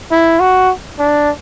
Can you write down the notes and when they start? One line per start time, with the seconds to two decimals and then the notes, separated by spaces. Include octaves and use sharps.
0.11 E4
0.40 F#4
0.99 D4